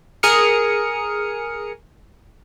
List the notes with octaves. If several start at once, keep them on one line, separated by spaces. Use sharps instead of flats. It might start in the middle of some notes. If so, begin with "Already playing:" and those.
G#4 A#4 D#6 F6 C#7